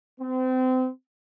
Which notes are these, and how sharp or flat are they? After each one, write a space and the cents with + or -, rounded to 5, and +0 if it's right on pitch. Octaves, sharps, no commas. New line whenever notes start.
C4 -30